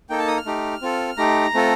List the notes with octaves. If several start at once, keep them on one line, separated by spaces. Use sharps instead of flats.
A#3 D#4 A4 G5
A5
D#6
F6
A3 D#4 G4
C4 F4 A4
A3 D#4 G4 A#5
A3 C4 F4 A4